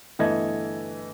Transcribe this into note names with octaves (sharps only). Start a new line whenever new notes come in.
G1 E3 A3 A4 D#5 G#6